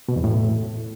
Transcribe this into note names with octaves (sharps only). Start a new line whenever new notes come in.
B2
E2
A2